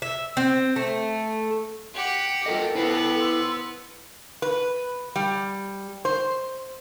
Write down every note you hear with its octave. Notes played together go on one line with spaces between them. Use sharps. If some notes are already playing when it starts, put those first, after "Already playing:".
E5
C4
A3
G4 F#5
F4 A4 A#4 D#5 G5
B3 E4 B4 C5
C6 E6
B4
G3
C5